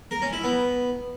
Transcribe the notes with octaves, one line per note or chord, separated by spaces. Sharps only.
A#4
C#4
E4
B3